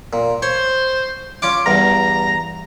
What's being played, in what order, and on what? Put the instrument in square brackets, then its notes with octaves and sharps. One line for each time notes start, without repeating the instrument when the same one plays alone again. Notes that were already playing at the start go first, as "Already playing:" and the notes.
[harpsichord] A#2
[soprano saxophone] C5 [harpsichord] C#5
[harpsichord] C#4 F4 F5 [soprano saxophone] D6
[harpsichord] E2 G2 [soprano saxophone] A#5